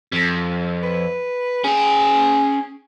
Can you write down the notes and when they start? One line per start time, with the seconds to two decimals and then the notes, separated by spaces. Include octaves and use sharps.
0.12 F2
0.83 B4
1.64 C#4 G#4 G5